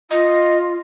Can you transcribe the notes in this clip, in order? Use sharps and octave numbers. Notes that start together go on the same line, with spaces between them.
F4 D#5